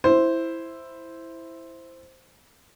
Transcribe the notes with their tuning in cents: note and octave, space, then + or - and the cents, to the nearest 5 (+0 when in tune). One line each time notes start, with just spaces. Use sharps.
E4 +0 C5 +0